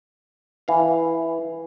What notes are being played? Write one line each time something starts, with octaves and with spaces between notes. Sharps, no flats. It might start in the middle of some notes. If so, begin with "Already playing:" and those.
E3 F5